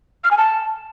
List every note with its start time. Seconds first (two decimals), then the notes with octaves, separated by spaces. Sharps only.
0.24 F6
0.31 G#5
0.38 A5